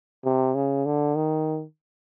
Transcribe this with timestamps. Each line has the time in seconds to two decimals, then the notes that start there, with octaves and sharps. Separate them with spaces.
0.24 C3
0.55 C#3
0.86 D3
1.15 D#3